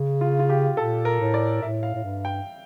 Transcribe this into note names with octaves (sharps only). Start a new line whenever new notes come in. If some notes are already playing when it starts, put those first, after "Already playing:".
Already playing: C#3
F4
F4
G4
A#2 A4
A#4
A2
D5
A2 E5
F5
A2
G2
G5